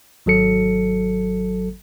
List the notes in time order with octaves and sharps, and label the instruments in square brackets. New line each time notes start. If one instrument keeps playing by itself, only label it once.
[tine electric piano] G#1 F#3 A4 C#7